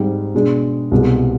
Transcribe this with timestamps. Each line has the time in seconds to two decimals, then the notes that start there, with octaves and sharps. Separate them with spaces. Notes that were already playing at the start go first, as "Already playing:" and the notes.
Already playing: G#2 G3 C4
0.35 B2 G#3 D4
0.91 C2 B2 G#3